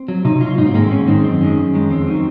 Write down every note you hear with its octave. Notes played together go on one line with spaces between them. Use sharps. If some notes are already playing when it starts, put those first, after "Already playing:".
Already playing: C4
F#3
C3 D#4
F#3 F4
G#2 D#4
C4
D#3 G#3 A#3
C4
G#2 C#4
D#3 G#3 C4
F#2 C4
D#3 G#3 C#4
F#2
D#3 G#3
F2 C4
D#3 F#3